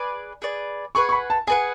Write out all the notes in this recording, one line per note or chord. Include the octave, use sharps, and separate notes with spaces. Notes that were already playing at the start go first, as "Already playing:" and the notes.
Already playing: G#4 B4 D5
G#4 B4 D5
G#4 B4 F#5 C#6
C#6
B5
A5
G#4 B4 F#5 G#5